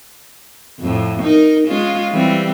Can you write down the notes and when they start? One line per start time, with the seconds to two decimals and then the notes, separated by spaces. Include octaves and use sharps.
0.80 F2 A2
1.22 D#4 A#4
1.68 G#3 C#4 F4
2.12 E3 G3 C4